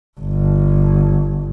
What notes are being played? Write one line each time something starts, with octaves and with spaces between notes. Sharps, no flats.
G1